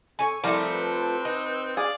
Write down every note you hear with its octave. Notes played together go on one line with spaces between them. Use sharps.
A4 C#5 G#5
F3 G3 A3 C4 E4 A#4
B4
D#4
G#4 D5 F5